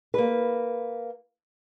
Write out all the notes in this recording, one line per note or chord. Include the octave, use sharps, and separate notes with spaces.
A#3 B4